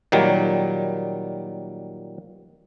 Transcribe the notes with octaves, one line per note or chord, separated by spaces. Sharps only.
A#2 D#3 F#3 G3